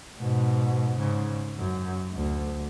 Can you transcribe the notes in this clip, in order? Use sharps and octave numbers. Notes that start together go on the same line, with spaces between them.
G#2 B2
G#2 C#3
F#2
D2